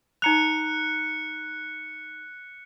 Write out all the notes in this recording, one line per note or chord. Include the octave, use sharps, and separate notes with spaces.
D#4 A#5 F#6 C#7 F7